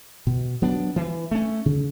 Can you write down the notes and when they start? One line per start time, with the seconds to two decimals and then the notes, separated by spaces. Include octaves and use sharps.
0.27 B2
0.62 F#3 B3 D4
0.96 E3
1.31 A3 C#4
1.66 C#3